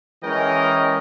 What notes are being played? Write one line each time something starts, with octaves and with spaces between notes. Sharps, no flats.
E3 G#3 C#4 A#4 D#5 G5